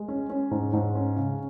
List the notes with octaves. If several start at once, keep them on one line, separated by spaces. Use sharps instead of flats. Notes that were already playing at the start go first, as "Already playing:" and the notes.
Already playing: G#3
C#4
C#4
G#2
G#2
C#4
C#3